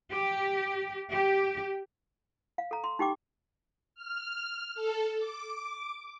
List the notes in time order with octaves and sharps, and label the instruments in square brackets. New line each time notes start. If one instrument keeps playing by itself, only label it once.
[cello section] G4
G4
[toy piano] F5
A4 A#5
C6
D#4 G4 G5 D6
[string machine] F6
A4
D6